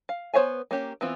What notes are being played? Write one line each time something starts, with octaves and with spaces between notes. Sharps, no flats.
F5
B3 C5 C#5 F5 G#5
A#3 C#4 G4
E3 B3 C4 F4